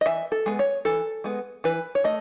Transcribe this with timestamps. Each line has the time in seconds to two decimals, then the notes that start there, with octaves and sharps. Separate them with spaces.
0.01 D#5
0.06 E3 E5
0.32 A4
0.46 G#3 B3
0.59 C#5
0.85 E3 A4
1.24 G#3 B3
1.64 E3 B4
1.95 C#5
2.04 A3 D#5